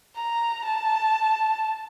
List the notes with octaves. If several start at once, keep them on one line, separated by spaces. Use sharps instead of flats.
A#5
A5